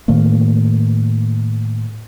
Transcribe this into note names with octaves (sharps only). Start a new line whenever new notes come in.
A2 D#3 A3 A#3